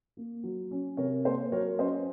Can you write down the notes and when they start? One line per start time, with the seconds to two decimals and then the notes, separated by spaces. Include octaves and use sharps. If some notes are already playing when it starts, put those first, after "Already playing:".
0.17 A#3
0.43 F#3
0.71 C#4
0.97 C3 A#4 C#5
1.25 A#3 A4 C5
1.52 F#3 A#4 C#5
1.79 C#4 C5 D#5